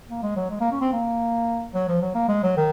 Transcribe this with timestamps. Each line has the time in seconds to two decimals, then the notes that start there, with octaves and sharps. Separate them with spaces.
0.10 A#3
0.22 G#3
0.36 F#3
0.50 G#3
0.60 A#3
0.72 C#4
0.81 C4
0.92 A#3
1.74 F#3
1.88 F3
2.02 F#3
2.15 A#3
2.28 G#3
2.43 F#3
2.57 D#3